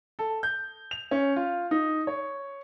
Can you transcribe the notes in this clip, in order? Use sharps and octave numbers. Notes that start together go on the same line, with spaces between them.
A4
G6
F7
C#4
F4
D#4
C#5